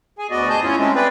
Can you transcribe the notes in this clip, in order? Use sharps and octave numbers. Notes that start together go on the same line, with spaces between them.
G#4 G#5
D2 B3 F#4 D5 D#5
G2 G#4 D#5 G#5 A5 G6
C#4 E4 F4 C#5
G#3 A3 C4 C#4
G#4 B4 D5 G5